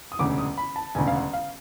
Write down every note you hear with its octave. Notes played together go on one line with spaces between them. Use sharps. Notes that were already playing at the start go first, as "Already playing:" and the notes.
D#6
E1 D2 C#3 D6
D#6
B5
A5
E1 D2 C#3 G#5
F5
F#5
F5